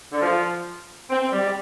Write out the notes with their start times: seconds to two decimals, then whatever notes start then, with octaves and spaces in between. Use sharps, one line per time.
0.12 D3
0.22 F3
1.10 C4
1.21 C4
1.32 G3
1.43 G3